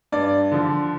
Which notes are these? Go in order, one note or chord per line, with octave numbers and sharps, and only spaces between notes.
G2 D5
D3 F3